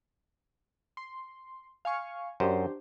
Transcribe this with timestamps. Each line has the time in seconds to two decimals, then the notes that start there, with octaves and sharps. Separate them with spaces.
0.97 C6
1.85 F5 G#5 C#6
2.40 F#2 D4 G4 C5